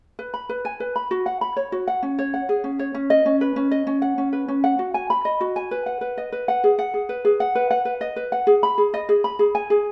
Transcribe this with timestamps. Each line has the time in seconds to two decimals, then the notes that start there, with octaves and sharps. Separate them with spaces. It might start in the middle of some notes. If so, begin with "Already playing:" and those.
0.19 B4
0.34 B5
0.49 B4
0.65 G#5
0.80 B4
0.96 B5
1.11 F#4
1.26 F#5
1.41 B5
1.56 C#5
1.72 F#4
1.88 F#5
2.03 C#4
2.19 C#5
2.34 F#5
2.49 G#4
2.64 C#4
2.79 C#5
2.95 C#4
3.10 D#5
3.26 C#4
3.41 B4
3.56 C#4
3.71 D#5
3.87 C#4
4.02 F#5
4.18 C#4
4.33 B4
4.48 C#4
4.64 F#5
4.79 F#4
4.94 G#5
5.10 B5
5.25 D#5
5.41 F#4
5.56 G#5
5.71 B4
5.86 F#5
6.01 B4
6.18 D#5
6.32 B4
6.48 F#5
6.64 G#4
6.79 F#5
6.94 G#4
7.09 B4
7.25 G#4
7.40 F#5
7.55 B4
7.71 F#5
7.85 B4
8.01 D#5
8.16 B4
8.32 F#5
8.47 G#4
8.63 B5
8.78 G#4
8.94 D#5
9.09 G#4
9.24 B5
9.39 G#4
9.55 G#5
9.70 G#4